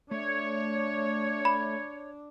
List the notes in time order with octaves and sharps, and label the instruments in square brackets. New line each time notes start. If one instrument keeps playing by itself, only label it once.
[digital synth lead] A3 [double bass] D4 [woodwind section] C#5
[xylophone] B5